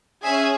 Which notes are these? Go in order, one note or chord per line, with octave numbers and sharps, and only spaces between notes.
C#4 G#4 E5 G#5